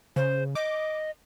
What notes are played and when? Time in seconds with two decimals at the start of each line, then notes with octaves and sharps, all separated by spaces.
0.16 C#3 C5
0.55 D#5 D6